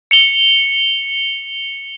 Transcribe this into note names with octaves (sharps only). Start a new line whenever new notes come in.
C#7 F7 G7